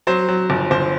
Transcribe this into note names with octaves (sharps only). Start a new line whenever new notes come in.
F#3 C5
F#3
G1
G1 C5